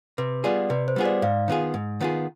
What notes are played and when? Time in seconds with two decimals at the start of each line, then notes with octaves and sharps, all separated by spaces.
0.18 C3 B4
0.44 G3 B3 F4 G#4 D5
0.70 C3 B4
0.88 C5
0.96 G3 B3 F4 G#4
1.06 D5
1.22 G#2 F5
1.48 D#3 B3 F4 G#4
1.74 G#2
2.00 D#3 B3 F4 G#4